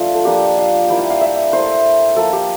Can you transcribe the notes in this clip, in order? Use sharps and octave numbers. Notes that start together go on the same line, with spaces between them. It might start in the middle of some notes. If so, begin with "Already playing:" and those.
Already playing: F3 A3 D4 F4
A4
F3 A#3 D4 F4 G4
F5
G3 A#3 E4 G5
F5
F5
E5
A3 E4 C5
F3 A#3 F4 A4
G4